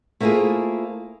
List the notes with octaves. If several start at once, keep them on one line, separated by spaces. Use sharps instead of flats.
A3 A#3 C4 E4 F4 G#4